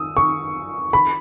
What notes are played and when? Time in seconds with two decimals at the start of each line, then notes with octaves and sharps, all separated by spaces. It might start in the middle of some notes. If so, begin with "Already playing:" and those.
Already playing: D#6 E6
0.17 C#6
0.93 B5